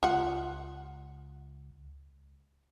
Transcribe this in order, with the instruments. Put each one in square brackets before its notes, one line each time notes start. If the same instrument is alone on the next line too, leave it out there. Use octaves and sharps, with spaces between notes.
[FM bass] C#2 [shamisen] F4 F#5